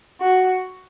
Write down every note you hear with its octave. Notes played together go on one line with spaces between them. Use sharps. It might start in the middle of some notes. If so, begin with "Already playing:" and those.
F#4